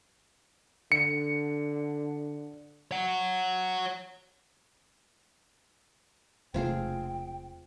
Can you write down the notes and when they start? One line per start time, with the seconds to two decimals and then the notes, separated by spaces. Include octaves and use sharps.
0.92 D3 C#7
2.91 C#5 F#5
6.54 E1 C3 A3 C4 F4 G#4 G5